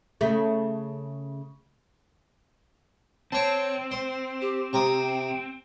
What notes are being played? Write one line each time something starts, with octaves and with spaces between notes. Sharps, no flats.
C#3 A3
C4 C#5 A5
C5
G4
C3 G5 A#5 D#6